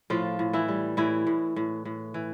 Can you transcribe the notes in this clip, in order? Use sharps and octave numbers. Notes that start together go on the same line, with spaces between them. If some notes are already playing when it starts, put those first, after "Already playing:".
A2 F3 F4
A2
E3 E4
G3
A2 E3 E4
A2
A2
A2
E3